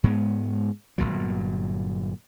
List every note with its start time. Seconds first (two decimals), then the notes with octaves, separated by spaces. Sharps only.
0.04 G#2 G#3 B3
0.98 G1 C#2 A#2 F#3